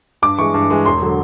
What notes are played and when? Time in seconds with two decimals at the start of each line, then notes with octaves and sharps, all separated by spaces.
0.22 G2 D6
0.38 E3 G#3 C#6
0.54 G2
0.70 E3 G#3
0.85 E1 C6
1.02 D3 F#3